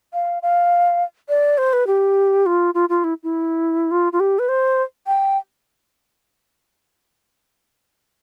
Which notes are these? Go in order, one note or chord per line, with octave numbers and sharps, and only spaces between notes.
F5
F5
D5
C5
B4
G4
F4
F4
F4
E4
E4
F4
F4
G4
B4
C5
G5